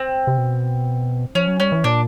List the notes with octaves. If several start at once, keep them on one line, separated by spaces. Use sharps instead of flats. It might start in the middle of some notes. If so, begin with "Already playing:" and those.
Already playing: C4
C3
B2
F3 C#4
F#3
G3 C#4
E3
A#2 D4